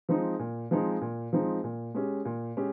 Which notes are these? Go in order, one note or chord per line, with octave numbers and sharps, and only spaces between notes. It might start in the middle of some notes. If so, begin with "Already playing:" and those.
F3 G#3 C4 D#4
A#2
F3 G#3 C4 D#4
A#2
F3 G#3 C4 D#4
A#2
G#3 C#4 G4
A#2
G#3 C#4 G4